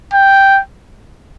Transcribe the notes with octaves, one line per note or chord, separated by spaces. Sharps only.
G5